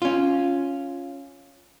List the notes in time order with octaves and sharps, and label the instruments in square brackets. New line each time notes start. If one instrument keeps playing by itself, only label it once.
[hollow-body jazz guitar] C#4 F4